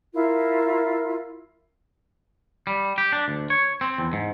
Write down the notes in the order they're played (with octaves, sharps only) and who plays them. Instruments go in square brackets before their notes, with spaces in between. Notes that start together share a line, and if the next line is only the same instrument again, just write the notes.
[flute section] E4 F4 A#4
[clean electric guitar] G3
G4
D4
D2
C#5
C4
E2
G#2